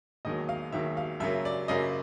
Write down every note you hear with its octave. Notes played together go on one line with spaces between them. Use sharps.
E1 D#2 D#3 F#3 D#5
F5
E1 D#2 D#3 F#3 E5
F5
F#2 C#3 F#3 A#3 E5
D5
F#2 C#3 F#3 A#3 D#5